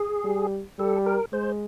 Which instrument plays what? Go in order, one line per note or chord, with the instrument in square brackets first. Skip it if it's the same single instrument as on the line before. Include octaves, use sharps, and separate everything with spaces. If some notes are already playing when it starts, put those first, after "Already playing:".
Already playing: [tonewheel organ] G#4
[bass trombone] G3
[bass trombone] G3 [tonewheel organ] A4
[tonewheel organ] A#4
[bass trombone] G#3 [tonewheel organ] C5